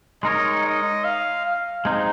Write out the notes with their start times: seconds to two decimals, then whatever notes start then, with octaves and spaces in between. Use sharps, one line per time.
0.23 G#3 D#4 A#4 C#5 D#5
0.65 D#5
1.04 F5
1.45 F5
1.85 G#3 C4 D#4